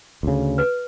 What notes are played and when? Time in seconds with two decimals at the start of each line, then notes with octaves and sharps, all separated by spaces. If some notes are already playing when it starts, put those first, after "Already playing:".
0.23 D2 C#3
0.58 B4